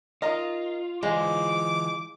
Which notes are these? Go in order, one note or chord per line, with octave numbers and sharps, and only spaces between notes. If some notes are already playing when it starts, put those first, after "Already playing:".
D#4 F4 A#4 D#5
E3 G#3 F4 C5 D6